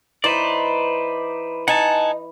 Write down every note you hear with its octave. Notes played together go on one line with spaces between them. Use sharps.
E3 D#4 B4 C5 D5 D6
D#4 F#5 G#5 A5